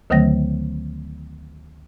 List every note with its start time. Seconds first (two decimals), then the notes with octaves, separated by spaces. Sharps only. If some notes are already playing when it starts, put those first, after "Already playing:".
0.10 D2 D3 D#3 F#3 A3 A#6